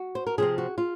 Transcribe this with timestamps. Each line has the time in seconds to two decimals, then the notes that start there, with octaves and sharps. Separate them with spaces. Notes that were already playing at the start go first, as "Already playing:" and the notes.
Already playing: F#4
0.15 C5
0.27 A#4
0.38 C3 F3 C4 G#4
0.58 F#4
0.78 F4